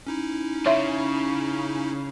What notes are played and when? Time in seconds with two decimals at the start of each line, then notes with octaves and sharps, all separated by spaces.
0.07 C#4 D#4 E4
0.66 C#3 C#5 E5